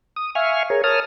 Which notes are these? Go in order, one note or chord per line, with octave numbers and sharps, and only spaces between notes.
D#6
E5 F5 G#5 C#6 F6
G#4 A#4 C#5
A#4 C#5 A5 D#6 F6